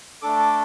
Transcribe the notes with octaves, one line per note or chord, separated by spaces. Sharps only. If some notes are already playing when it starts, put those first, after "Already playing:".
A3 D4 A4 D6
D6